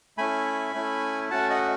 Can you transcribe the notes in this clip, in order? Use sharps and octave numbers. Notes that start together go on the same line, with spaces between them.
A3 C#4 E4 G#5 B5
A3 C#4 E4
A3 C#4 F#4 F#5 A5
D#5 F#5